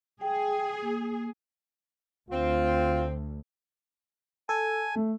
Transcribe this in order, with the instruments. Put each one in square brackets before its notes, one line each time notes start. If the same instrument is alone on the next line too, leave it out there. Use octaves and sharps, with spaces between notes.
[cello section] G#4 [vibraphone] G5
[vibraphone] A#3
[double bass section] D2 [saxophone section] C4 [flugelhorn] F4
[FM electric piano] A4 [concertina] G#5
[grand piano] A3